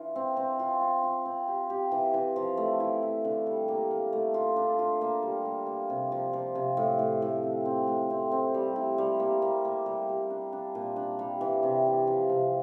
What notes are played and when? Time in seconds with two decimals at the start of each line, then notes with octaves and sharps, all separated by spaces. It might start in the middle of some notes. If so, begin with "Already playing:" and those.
Already playing: E3 D4 F4
0.16 C4
0.37 C4
0.59 F4
0.81 F4
1.04 F4
1.26 C4
1.48 G4
1.70 G4
1.92 E3
2.14 E3
2.36 F3
2.57 A3
2.80 E4
3.03 E4
3.25 D3
3.47 G3
3.68 A#3
3.91 A#3
4.13 A3
4.34 F4
4.56 D4
4.79 F4
5.01 A#3
5.22 G3
5.45 A#3
5.66 A#3
5.90 C3
6.12 F3
6.33 F3
6.55 C3
6.77 A2
6.99 A2
7.22 A2
7.43 C4
7.65 C4
7.87 A2
8.10 C4
8.32 C4
8.54 G3
8.76 E4
8.98 G3
9.20 A#3
9.42 A#3
9.65 A#3
9.86 G3
10.09 G3
10.30 D4
10.52 D4
10.75 A#2
10.96 D4
11.19 G3
11.41 E3
11.63 C3
11.86 E3
12.07 F3
12.29 C3